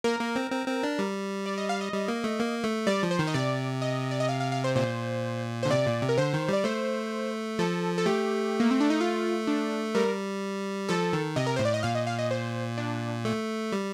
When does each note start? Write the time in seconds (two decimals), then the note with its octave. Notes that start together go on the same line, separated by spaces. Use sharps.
0.04 A#3 A#4
0.20 A#3
0.36 C4
0.52 C4
0.68 C4
0.83 D4
0.99 G3
1.46 D5
1.58 D#5
1.69 F5
1.81 D#5
1.93 G3
2.08 A#3
2.24 A3
2.40 A#3
2.64 A3
2.87 G3 D5
3.03 F3
3.11 C5
3.19 D#3
3.27 D#5
3.34 C3 D5
3.82 D#5
4.11 D5
4.20 D#5
4.29 F5
4.40 F5
4.52 F5
4.64 C5
4.76 A#2 C5
5.63 D3 C5
5.70 C3 D5
5.87 A#2
6.02 C3
6.09 A#4
6.18 D3 C5
6.33 D#3
6.49 G3 D5
6.64 A3 C5
7.59 F3 A4
7.98 A4
8.06 A3 G4
8.60 A#3
8.71 C4
8.80 D4
8.90 D#4
9.01 F4
9.47 D4
9.95 G3 A#4
10.89 F3 A4
11.13 D#3
11.36 C3 D#5
11.47 A#4
11.56 A2 C5
11.65 D5
11.74 D#5
11.83 A#2 F5
11.95 D#5
12.07 F5
12.19 D#5
12.31 C5
12.78 D4
13.25 A3
13.72 G3